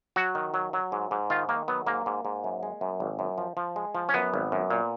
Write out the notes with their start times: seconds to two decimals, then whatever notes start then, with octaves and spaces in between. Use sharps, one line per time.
0.16 F#3 F#4
0.35 D#3
0.54 F#3
0.73 F#3
0.92 G#2
1.11 G#2
1.30 D#3 F4
1.49 D#3 A#3
1.68 F#3 B3
1.86 G#2 A#3
2.06 G#2
2.25 G#2
2.44 F#2
2.63 G#3
2.81 F#2
3.00 G#1
3.19 F#2
3.38 F3
3.57 F3
3.76 G#3
3.95 F3
4.09 C#4
4.14 F#2 B3
4.34 G#1
4.52 F#2
4.70 A#2